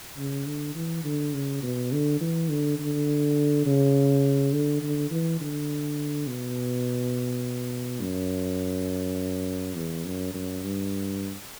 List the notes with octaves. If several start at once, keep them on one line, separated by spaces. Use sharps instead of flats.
C#3
D3
E3
D3
C#3
B2
D3
E3
D3
D3
C#3
D3
D3
E3
D3
B2
F#2
E2
F#2
F#2
G2